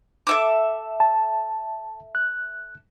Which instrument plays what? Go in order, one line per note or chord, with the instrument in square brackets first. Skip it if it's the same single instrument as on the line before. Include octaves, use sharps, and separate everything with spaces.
[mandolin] A4 E5 D6
[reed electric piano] A5
F#6